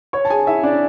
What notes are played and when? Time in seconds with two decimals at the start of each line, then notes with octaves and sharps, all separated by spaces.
0.13 C#5 C#6
0.25 A5
0.30 G#4 G#5
0.47 E4 E5
0.63 D4 D5